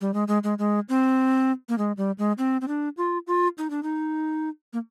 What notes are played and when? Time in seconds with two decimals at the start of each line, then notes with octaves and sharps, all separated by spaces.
0.01 G3
0.14 G#3
0.28 G#3
0.44 G#3
0.59 G#3
0.89 C4
1.69 A#3
1.78 G#3
1.97 G3
2.19 G#3
2.38 C4
2.61 C4
2.68 D4
2.97 F4
3.27 F4
3.58 D#4
3.70 D4
3.83 D#4
4.73 A#3